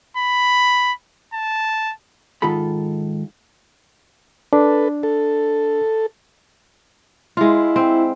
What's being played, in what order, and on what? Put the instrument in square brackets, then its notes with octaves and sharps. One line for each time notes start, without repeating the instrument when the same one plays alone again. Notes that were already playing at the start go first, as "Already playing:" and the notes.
[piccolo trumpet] B5
A5
[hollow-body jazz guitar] G#2 D#3 F4 A4 B5
[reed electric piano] D4 [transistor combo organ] A4 B4
[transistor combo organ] A4
[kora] G#3 F4 [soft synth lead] E4
[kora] C4